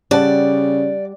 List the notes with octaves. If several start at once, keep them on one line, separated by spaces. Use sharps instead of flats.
C#3 G3 D5 F#5 A5